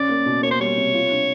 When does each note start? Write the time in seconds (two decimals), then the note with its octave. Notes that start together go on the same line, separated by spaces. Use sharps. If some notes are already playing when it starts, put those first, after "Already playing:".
Already playing: C#3 C#4 D5
0.09 A#3
0.26 B2
0.43 A#3 C#5
0.51 C5
0.60 G3 C#5
0.77 C3
0.94 F4
1.11 D4